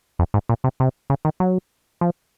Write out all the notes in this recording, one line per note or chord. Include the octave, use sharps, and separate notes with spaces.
F2
G#2
A#2
C3
C3
C#3
D#3
F#3
F3